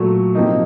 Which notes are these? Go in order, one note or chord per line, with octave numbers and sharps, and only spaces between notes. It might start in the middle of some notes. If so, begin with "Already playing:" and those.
Already playing: A#2 F#3 A3
C3 F3 A#3 D#4